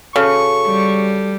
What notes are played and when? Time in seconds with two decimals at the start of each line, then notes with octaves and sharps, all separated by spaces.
0.16 C#3 F#4 A4 A5 C#6
0.68 G3